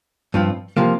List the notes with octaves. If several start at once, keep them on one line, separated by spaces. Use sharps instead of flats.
G2 F3 C4
C3 F3 A#3